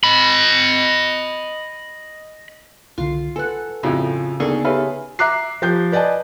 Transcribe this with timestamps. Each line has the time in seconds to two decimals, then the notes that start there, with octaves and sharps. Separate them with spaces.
0.04 D#5 B5
2.98 C2 D3 F4
3.36 A4 B4 F#5 G#5
3.83 F2 A2 C#3 F4 F#4
4.40 D2 A#3 B3 D#4 G#4 A4 C#6
4.65 G4 A4 B4 C#5 E5 F5
5.19 E5 A#5 D6 F#6 C7
5.62 F3 G4 G6
5.92 B4 D5 D#5 G#5 A5